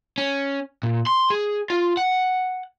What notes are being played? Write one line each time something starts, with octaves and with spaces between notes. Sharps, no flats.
C#4
A#2
C6
G#4
F4
F#5